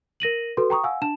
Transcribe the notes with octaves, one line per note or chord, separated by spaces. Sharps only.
A#4 A#6 D#7 F#7
F#4 A4 B4 C6
G5 A#5 C#6 D#6
F5 F#5 G#5 E6
D4 A5 E7